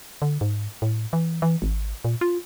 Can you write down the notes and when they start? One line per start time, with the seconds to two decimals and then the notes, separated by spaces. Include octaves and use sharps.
0.22 D3
0.41 G#2
0.82 A2
1.13 E3
1.42 E3
1.62 G#1
2.04 A#2
2.21 F4